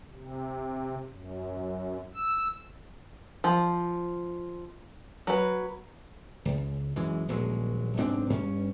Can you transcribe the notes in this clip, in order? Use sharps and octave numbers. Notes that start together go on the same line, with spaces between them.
C3
F#2
E6
F3
F#3 B4
C#2
F#2 E3 G#3
D#1 A#1 F#3 G#3
B1 G#2 C4 D4
G2 C#4